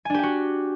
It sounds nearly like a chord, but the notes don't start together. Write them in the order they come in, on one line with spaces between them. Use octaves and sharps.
G#5 D4 G4 G5 F#4